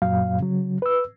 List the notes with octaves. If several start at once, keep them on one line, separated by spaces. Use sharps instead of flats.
F#2 A#2 F#3 F5
C#3 F#3
B4 E6